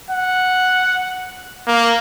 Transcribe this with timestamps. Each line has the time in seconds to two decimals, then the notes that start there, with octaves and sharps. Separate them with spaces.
0.11 F#5
1.67 A#3